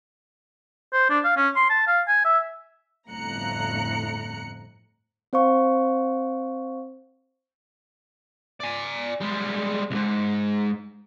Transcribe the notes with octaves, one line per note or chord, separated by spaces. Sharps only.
C5
D4
F5
C#4
C6
A5
F5
G#5
E5
G1 F2 A2 A#5 F#6 C#7
C4 C5 F5 C#6
D5 G#5
G3 G#3
C2 G#2